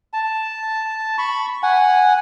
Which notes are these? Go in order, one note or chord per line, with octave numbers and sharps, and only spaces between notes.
A5
B5 C#6
F#5 G#5